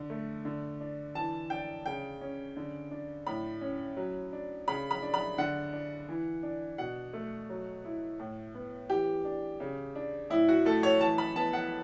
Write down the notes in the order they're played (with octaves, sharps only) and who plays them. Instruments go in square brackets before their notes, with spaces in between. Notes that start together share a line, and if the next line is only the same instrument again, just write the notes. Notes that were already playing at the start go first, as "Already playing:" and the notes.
Already playing: [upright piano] D3
A3
D3
D4
E3 A5
D4 G5
C#3 G5
C#4
D3
D4
A2 B5
C#4
F#3
D4
C#3 B5
B5
D4
B5
D3 F#5
D4
E3
D4
B2 F#5
A3
F#3
E4
A2
B3
E3 G4
D4
C#3
D4
A2 E4
F#4
A3 A4
C#5
E3 A5
B5
B3 A5
F#5